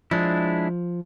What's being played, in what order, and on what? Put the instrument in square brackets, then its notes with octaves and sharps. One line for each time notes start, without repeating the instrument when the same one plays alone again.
[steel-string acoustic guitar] F3 [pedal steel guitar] G#3 D4 E4